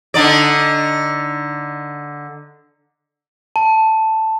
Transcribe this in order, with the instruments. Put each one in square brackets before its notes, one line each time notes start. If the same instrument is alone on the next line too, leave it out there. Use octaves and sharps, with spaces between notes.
[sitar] D3 D#4 D5
[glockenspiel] A5